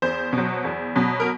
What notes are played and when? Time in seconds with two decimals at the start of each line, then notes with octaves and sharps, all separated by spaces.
0.02 E2 C5
0.33 B2
0.38 F#3
0.65 E2
0.96 B2 F#3
1.20 A#4